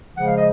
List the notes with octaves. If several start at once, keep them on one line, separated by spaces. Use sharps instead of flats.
C#3 F3 G#3 F#5
F5
D#5